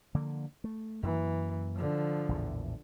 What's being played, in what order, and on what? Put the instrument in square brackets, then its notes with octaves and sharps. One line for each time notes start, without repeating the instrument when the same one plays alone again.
[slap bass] D3 F3 A#3
A3
[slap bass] F#2 A#3 [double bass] E3
[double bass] D3 F3
[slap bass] A#1 E2 A2